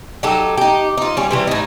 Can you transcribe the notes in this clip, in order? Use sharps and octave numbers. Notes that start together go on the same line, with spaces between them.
F#3 D#4 G4 A4
D#4 G4
D#4 F4
G3 C#4
C3 E3 G3
A2 D#4